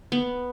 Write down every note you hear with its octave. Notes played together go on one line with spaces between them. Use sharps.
B3